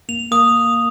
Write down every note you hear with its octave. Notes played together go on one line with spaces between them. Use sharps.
A#3 F7
A#3 D#6